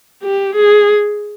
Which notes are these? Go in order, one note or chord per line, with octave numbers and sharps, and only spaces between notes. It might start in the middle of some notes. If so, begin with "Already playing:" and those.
G4
G#4